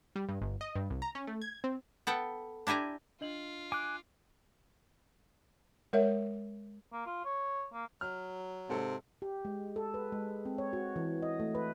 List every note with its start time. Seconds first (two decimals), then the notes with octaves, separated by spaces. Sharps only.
0.16 G3
0.29 G2
0.42 G1
0.61 D#5
0.76 G2
0.90 C2
1.02 A#5
1.15 C#4
1.27 A3
1.42 G#6
1.64 C4
2.07 B3 A4 F#5 G5
2.67 D4 E4 G4 G#5 A#5
3.21 D4 F4 D#5 F#7
3.72 G#5 D6 F#6
5.93 G#3 A#4 C#5 E5
6.92 A#3
7.06 F4
7.25 C#5
7.73 A#3
8.01 F#3 F6
8.69 G#2 C3 A4
9.22 G4
9.45 G#3
9.76 A4
9.94 B4
10.12 G#3
10.45 C4
10.58 C#5
10.73 F#4
10.96 E3
11.22 D#5
11.40 A3
11.55 B4